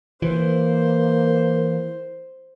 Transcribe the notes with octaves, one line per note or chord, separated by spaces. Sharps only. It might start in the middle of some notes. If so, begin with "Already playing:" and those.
E3 A#3 C5